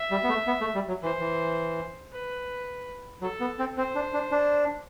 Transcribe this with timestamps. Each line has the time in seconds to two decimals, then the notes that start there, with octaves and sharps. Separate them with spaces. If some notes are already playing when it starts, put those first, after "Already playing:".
Already playing: E5
0.11 G3
0.24 B3
0.29 A3
0.47 B3
0.61 A3
0.75 G3
0.88 F#3
1.02 E3 C5
1.20 E3
2.12 B4
3.22 F#3 A4
3.40 B3
3.59 C4
3.77 C4 C5
3.95 D4
4.14 D4
4.32 D4